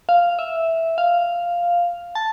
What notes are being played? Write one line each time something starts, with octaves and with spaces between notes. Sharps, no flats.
F5
E5
F5
A5